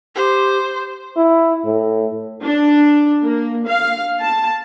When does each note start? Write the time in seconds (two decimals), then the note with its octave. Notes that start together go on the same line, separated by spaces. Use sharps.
0.16 G4 C5
1.17 E4
1.65 A2
2.43 D4
3.24 A#3
3.67 F5
4.21 A5